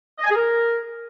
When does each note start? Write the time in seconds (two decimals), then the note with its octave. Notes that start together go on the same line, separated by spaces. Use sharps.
0.18 D#5
0.24 G#5
0.29 G#4
0.35 A#4